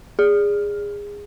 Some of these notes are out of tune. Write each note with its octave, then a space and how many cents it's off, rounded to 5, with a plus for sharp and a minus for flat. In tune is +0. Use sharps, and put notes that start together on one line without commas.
G#4 -20